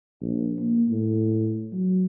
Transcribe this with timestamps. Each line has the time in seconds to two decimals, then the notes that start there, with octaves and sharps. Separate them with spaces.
0.21 A#1
0.59 A#3
0.88 A2
1.73 F#3